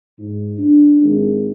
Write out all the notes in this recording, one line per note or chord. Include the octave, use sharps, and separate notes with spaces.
G#2
D4
G#1